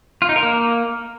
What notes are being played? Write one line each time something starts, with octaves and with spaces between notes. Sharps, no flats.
F4
D#4
A#4
A#3